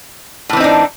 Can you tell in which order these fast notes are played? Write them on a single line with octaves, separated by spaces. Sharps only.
A2 E3 C4 D#4 D4